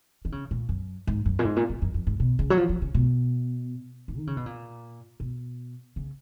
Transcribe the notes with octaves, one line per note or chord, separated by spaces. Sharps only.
D#3
C#3
A#2
F#2
G#2
F#2
A#2
G#2
A#2
G#2
F#2
F2
G#2
B2
C#3
F#3
F3
F3
C#3
B2
G#2
D#3
C#3
B2
A#2
B2
C#3